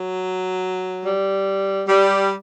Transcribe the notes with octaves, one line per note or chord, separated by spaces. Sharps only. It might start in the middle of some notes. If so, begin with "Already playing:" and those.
Already playing: F#3
G3
G3